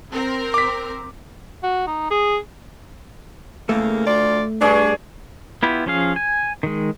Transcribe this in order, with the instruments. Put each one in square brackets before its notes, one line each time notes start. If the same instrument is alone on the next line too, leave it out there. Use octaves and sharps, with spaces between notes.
[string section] C4 A#4
[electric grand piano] D6 B6
[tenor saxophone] F#4
D#4
G#4
[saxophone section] E2 C#3 A#3 [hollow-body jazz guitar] A3
[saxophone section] D2 F4 D5
[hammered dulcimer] G2 G#4 C#5 [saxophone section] D4
[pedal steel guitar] B3 E4 F4 G4
F3 C#4 G#4 F5
G#5
D#3 G#3